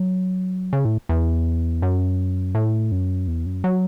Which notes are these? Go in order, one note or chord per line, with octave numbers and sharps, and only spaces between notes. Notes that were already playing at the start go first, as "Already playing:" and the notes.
Already playing: F#3
C#3
A2
E2
F#2
A2
F#2
E2
F#2
F#3